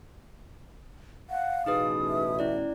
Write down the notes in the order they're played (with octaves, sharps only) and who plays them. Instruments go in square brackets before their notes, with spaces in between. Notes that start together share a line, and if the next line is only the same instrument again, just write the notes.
[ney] F5 [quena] F#5
[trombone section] A1 B2 [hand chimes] D#4 G#4 B4 [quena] D#6
[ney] E5
[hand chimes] C#4 E4 D5